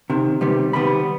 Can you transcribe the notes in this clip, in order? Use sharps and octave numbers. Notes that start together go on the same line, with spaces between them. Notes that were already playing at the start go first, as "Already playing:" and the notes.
C3 D#3
C3 D#3 G3 B3
C3 D#3 G3 B3 B5